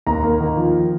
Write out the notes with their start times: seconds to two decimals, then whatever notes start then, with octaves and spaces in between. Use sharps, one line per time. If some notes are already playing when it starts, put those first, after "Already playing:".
0.06 D#2 A#5
0.23 A#3
0.40 D#3
0.57 F3